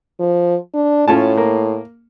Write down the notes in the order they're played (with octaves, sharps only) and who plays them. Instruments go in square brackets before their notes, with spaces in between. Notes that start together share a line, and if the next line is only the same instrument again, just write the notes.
[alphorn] F3
D4
[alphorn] A2 [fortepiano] C#4 F4 A5
[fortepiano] A#3